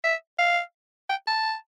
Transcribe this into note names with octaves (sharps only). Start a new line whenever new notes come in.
E5
F5
G5
A5